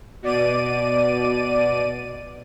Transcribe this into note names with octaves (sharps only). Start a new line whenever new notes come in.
B2 D5 D#7